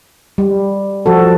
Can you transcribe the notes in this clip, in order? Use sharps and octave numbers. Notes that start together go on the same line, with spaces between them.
G3
F3 F#4 A4